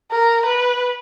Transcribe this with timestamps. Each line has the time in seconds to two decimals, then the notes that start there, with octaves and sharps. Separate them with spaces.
0.12 A#4
0.46 B4